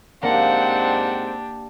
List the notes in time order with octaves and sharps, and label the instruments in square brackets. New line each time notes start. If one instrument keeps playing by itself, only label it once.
[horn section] G#2 C4 [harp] A#3 [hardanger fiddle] D4 G4 [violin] F#5